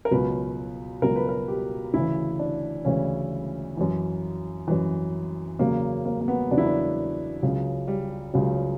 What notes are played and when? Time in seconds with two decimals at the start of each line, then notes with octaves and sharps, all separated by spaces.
0.05 A#4
0.11 C#2 B2 F#3 B4
1.02 C#2 B2 F#3 A#4
1.16 B4
1.29 A#4
1.48 G4
1.94 D2 C#3 E3 E4
2.39 D4
2.85 D2 C#3 E3 C#4
3.77 F#2 E3
4.68 F#2 E3
5.59 E2 C#3 F#3 A#3
6.05 A#3
6.21 A#3
6.28 B3
6.51 E2 C#3 F#3 D4
6.58 E4
6.66 D4
7.42 C#2 C#3 F#3
7.88 G3
8.34 C#2 C#3 F#3 G3